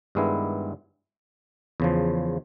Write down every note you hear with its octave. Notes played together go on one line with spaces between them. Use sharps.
G2 D#3 G#3 B3 E4
E2 C#3 F3